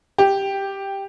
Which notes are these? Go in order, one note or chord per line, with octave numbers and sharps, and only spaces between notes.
G4